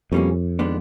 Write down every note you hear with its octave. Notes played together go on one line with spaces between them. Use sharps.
F2 B2 G3 A#3 C#4
D#3 G#3 B3 D4